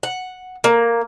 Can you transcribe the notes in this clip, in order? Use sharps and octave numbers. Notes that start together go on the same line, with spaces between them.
F#5
A#3